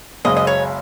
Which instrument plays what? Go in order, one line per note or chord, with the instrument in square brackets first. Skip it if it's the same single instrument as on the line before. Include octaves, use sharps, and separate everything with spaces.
[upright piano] F#1 F#2 C#3 G#3 [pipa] D#5
[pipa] D#5
C#5